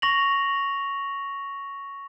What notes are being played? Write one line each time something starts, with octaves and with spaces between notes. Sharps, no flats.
C#6 A#6 F7 F#7